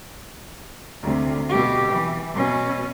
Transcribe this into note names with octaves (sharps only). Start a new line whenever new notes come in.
D2 C3
B2 G4
E3
B2 C#4